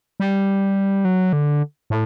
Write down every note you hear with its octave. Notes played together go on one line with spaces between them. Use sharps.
G3
F#3
D3
A2